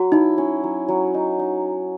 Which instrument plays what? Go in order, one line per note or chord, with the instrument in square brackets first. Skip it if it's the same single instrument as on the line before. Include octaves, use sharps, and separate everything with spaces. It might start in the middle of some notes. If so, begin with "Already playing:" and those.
Already playing: [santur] F#3 [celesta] F#4
[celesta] D#4 [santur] E4
[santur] C#4
F#3
F#3
D#4
D#4